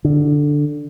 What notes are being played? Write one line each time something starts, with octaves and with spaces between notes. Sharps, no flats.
D3